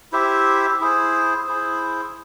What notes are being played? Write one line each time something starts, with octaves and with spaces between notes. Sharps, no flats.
E4 G4 C5 E5
E4 G#4 C5
E4 G#4 C5